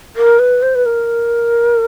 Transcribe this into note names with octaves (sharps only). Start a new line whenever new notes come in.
A#4
B4
C5
B4
A#4